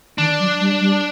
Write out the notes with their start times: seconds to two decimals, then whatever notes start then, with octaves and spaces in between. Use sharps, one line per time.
0.18 D#3 D4
0.39 F#3
0.60 G3
0.81 G3